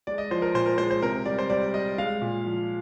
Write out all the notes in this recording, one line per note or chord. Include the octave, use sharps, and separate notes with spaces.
G#3 D5
D#5
F3 C5
A#4
A#2 C5
A#4
G#3 C5
C5
C3 A#4
G3 D5
C5
G3 D5
G3 D#5
G#3 F5
A#2
F3